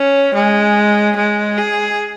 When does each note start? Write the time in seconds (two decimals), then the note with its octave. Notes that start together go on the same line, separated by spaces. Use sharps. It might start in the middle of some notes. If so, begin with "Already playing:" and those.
Already playing: C#4
0.35 G#3
1.17 G#3
1.57 G#4